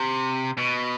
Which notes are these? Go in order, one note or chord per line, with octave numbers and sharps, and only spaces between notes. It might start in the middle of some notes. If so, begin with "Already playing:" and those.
Already playing: C3
B2